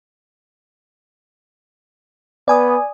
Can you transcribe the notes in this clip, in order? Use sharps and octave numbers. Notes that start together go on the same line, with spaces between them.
B3 D5 G#5 D#6